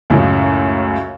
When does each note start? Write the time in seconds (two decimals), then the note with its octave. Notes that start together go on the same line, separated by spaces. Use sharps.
0.10 C#2 F#2 A2 C#3